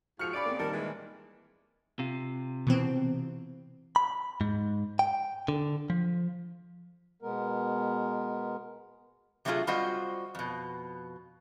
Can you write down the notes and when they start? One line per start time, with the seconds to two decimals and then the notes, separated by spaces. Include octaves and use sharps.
0.19 G#2 F3 F#4 F6 C#7 F7
0.33 C#3 D5 B5 D7
0.46 A#3 C4
0.59 A#2 D#3 G3 A4 A#4
0.73 E3 G#3
1.99 C3 F4
2.67 B2 E3 C4
3.96 B5
4.41 G#2
4.99 G5
5.48 D3
5.90 F3
7.22 B2 G#3 B3 A#4
9.45 C3 F#3 A3 E4 F4 G#4
9.67 G3 C4 F4 F#4 C5 D#5
10.35 F2 B2